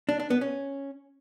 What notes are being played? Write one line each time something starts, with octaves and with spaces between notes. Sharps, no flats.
D4
D4
B3
C#4